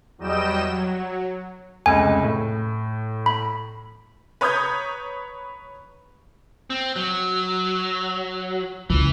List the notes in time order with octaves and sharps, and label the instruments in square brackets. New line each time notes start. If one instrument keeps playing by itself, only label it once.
[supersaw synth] E2 F#3 G3 D#5 G5 E7
F#3
[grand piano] F1 C#2 [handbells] G#5
[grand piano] A2
[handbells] B5
[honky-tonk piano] B4 C#5 A#5 D#6 G6 G#6
[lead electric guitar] C4
F#3
[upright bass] C#2 [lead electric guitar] E3